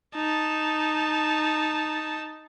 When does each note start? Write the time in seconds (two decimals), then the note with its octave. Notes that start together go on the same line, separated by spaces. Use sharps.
0.14 D#4 A5